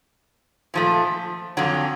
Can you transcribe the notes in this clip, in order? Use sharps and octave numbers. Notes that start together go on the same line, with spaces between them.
A#2 F3 A3
F2 D3 F#3